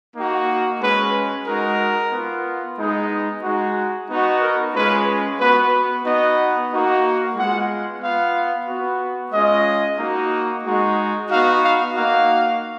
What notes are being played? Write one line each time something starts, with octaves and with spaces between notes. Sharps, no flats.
A#3 D#4 F#4
G#3 C#4 F#4 B4
G#3 D#4 F#4 A#4
B3 F4
G#3 B3 D#4
G#3 D#4 F#4
B3 D#4 F#4
A#4
G#3 C#4 F4 B4
B3 F#4 B4
B3 D#4 F#4 D#5
A#3 D#4 F#4
G#3 B3 F4 F#5
B3 F4 F5
B3 F#4
G#3 C#4 F4 D#5
A#3 D#4 F#4
G#3 D#4 F#4
B3 D#4 F#4 F5
F5
A#3 D#4 F#4 F5